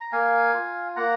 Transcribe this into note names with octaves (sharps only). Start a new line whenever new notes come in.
A#5
A#3 F5 G#5
F4
A#3 F#5 A#5